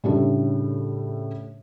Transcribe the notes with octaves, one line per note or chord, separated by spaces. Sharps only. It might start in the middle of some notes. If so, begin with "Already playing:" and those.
A2 C#3 G3 A3 D4